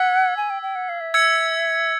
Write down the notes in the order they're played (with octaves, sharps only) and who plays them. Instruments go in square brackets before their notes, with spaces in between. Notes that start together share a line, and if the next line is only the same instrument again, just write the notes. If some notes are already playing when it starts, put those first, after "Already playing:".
Already playing: [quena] F#5 [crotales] E6 G#6 B6
[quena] G#5
G5
G5
F#5
F5
E5
[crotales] E6 G#6 C#7